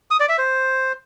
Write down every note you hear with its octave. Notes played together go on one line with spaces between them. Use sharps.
D#6
D5
E5
C5